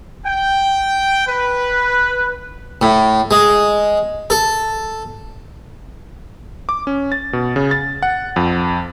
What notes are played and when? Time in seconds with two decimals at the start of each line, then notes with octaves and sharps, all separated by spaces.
0.25 G5
1.27 B4
2.82 A2
3.31 G#3
4.30 A4
6.69 D6
6.87 C#4
7.12 A6
7.33 B2
7.56 C#3
7.71 A6
8.02 F#5
8.36 F2